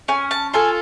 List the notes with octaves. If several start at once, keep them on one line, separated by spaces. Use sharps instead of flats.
C#4 G#5
A5
F4 A4 G#5